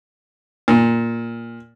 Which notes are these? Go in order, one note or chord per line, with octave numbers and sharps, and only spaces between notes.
A#2